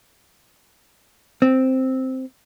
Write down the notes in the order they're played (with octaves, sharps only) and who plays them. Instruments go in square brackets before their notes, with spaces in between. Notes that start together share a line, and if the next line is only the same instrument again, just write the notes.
[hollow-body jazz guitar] C4